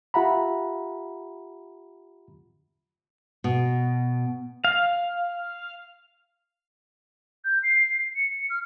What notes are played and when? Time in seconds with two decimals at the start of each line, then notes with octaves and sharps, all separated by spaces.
0.14 F4 G4 E5 F#5 A#5 B5
3.44 B2
4.64 F5
7.45 G6
7.63 C7
8.15 C#7
8.50 F6